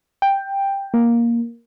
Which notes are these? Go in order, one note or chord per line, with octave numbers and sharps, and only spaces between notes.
G5
A#3